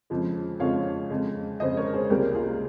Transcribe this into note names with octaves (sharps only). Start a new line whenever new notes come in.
F2 C#3 F3 G#3
F2 C#3 F3 G#3 C#5 F5
F2 C#3 G#3
F2 C#3 G#3 C5 D#5
A#4 C#5
G#4 C5
C#2 C3 G3 A#3 G4 A#4
F4 G#4